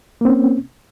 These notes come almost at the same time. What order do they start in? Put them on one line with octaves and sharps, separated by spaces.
A#3 C4 C#4